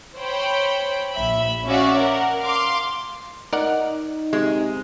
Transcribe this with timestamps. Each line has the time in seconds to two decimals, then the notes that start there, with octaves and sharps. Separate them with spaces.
0.17 C5 C#5 G5 B5
1.12 A#1 E5 B5
1.66 C#4 F#4 D5 E5 F5
1.96 A#4 F#5
2.42 F5 C6 D6
3.53 D#4 A#4 D5 F#5
4.33 C3 G#3